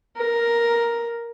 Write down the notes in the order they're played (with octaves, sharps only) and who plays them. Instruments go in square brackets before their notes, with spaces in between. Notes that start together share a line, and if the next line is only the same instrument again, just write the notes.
[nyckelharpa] A#4